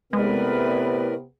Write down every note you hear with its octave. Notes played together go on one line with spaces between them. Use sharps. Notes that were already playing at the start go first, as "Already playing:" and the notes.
A2 C3 G#3 B3 A#4 B4 D5